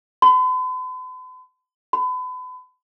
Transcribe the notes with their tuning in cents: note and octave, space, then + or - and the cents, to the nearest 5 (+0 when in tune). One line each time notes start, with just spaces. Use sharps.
B5 +45
B5 +35